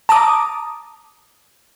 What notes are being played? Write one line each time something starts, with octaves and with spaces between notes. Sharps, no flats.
A5 A#5 D6 D#6